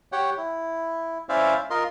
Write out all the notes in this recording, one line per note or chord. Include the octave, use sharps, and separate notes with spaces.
G4 C#5 F#5 G5
E4
C#4 E4 C5 D5 E5 F5
F4 A#4 D#5 C6